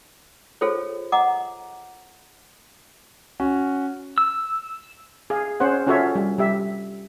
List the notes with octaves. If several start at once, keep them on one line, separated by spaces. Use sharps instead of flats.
F4 G#4 A4 C5 C#5
D#5 F#5 A#5 D6
C#4 F#4
E6
G#4 F5
C#4 G#4 C5 F#5
C#4 F4 F#4 A4 C#5 E5
G3
G3 G4 E5